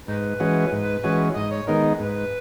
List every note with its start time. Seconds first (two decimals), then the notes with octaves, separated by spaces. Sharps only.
0.08 G#2 D#4 B4
0.40 E3 G#3 C#4 F#4
0.72 G#2
1.04 E3 G#3 C#4 F#4
1.35 G#2 D#5
1.51 C#5
1.67 D#3 G#3 B3 D#4 A#4
1.99 G#2 B4